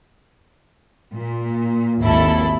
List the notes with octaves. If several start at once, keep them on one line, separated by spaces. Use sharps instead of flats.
A#2
G#1 D#2 E4 A4